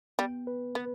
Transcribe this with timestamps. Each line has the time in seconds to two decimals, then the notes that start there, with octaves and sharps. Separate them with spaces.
0.19 G3 B3
0.47 B4
0.75 B3 B4